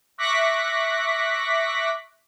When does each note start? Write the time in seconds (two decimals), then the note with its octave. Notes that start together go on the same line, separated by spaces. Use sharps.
0.18 E5 C#6 D6 F#6 A#6 B6